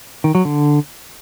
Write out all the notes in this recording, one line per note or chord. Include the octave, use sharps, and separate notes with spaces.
D#3
F#3
D3